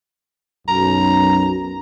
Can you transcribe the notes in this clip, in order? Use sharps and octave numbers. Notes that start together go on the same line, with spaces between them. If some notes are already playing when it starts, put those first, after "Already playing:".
B1 F#2 A#5